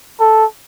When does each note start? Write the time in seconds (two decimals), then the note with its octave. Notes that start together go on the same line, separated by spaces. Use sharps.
0.20 A4